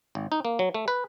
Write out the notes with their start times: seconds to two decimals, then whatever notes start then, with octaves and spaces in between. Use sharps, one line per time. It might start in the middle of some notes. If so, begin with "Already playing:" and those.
0.15 G#1
0.32 D#4
0.45 A#3
0.59 F#3
0.74 A3
0.88 B4